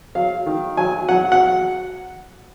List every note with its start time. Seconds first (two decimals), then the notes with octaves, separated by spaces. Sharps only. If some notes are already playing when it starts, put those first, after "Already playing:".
0.15 F#3 F5
0.46 D#3
0.77 F#3 G#5
1.08 F#3 F#5
1.32 F#5